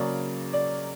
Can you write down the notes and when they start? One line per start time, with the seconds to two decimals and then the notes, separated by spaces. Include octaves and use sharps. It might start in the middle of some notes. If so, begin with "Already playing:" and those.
Already playing: C#3 F#3 A#3 C#4 D5
0.53 D5